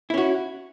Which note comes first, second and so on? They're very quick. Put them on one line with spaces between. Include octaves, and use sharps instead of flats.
E4 C#4 F#4